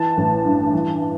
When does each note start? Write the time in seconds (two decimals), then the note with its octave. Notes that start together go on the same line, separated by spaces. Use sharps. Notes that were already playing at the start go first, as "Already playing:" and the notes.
Already playing: E3 A5
0.17 A1
0.45 G2
0.73 E3